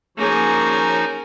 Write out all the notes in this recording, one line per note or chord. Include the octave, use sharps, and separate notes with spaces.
F3 A#3 C#4 D#4 F#4 G#4 A#4 G#5